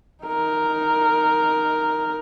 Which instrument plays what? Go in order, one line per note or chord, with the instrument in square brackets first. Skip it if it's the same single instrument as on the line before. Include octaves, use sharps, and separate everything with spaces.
[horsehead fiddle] D#4 A#4